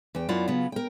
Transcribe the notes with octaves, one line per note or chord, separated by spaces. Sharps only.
E2 G5
F#2 E4 F4 D5 F#5
C#3 F#3 B3 F4
A#4 G5